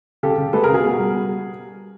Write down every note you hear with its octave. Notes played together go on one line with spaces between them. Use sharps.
C#3 G4 A4
C#3
G#3 A4 B4
C#3 G#4 A#4
F#4 G#4
B2
G3